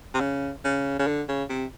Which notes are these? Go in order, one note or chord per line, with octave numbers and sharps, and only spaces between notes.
C3
C#3
C#3
C#3
D3
C#3
C3